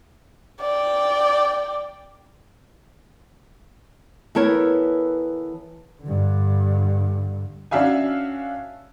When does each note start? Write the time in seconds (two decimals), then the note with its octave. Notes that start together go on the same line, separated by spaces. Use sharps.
0.60 D5 G5
4.35 E3 B3 A4 A#4 C#5
6.03 G2 D3
7.71 C#4 D4 F#4 E5 F5 G#5